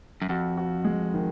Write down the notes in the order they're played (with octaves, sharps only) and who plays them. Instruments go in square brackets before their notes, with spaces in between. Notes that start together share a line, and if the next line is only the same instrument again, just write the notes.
[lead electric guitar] F#2
[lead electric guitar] F2 [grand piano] F#4
[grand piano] F#4
G#3
D#3